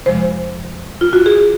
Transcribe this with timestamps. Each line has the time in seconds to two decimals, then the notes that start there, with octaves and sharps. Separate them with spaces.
0.06 F2 C3 F3 G#3 C5
1.01 F4
1.13 F#4
1.26 G#4